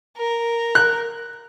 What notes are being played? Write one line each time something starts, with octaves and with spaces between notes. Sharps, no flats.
A#4
F#6